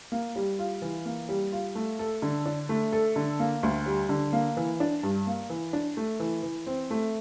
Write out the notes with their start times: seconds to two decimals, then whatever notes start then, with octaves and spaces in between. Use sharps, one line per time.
0.12 A#3
0.36 G3
0.59 F4
0.82 E3
1.06 A#3
1.29 G3
1.52 F4
1.75 A3
1.99 A4
2.22 D3
2.46 D4
2.69 A3
2.92 A4
3.16 D3
3.40 A#3
3.63 D2
3.86 G3
4.09 D3
4.33 A#3
4.57 E3
4.80 D4
5.03 G2
5.27 A#3
5.50 E3
5.73 D4
5.97 A3
6.20 E3
6.43 E3
6.67 C4
6.90 A3